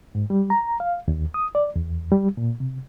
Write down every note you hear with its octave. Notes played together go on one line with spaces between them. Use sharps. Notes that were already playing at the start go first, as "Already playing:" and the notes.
G#2
G3
A#5
F5
D#2
D#6
D5
E2
G3
A#2
C3